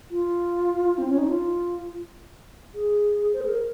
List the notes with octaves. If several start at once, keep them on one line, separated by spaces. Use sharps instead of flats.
F4
C4
C#4
D#4
F4
G#4
C5
G#4
A#4